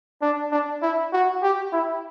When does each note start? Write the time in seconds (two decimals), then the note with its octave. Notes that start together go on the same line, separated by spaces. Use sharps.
0.22 D4
0.52 D4
0.82 E4
1.12 F#4
1.43 G4
1.73 E4